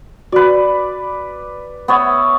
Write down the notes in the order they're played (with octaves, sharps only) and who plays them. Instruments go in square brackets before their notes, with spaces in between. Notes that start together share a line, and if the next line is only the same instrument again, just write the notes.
[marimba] F#4 [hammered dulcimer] B4 D5
[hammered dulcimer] B3 C#5 E5